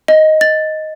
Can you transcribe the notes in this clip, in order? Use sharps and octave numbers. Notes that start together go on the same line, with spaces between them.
D#5
A6